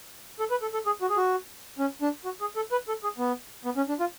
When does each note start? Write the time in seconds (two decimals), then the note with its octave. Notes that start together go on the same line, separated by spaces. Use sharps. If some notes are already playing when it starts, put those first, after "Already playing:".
0.39 A4
0.51 B4
0.62 A4
0.73 A4
0.86 G#4
1.01 F#4
1.09 G#4
1.17 F#4
1.79 C#4
2.02 D4
2.25 F#4
2.41 G#4
2.56 A4
2.72 B4
2.88 A4
3.03 G#4
3.18 B3
3.65 B3
3.77 C#4
3.89 D4
4.00 F4